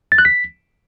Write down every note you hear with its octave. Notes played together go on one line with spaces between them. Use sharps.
A6
F#6
B6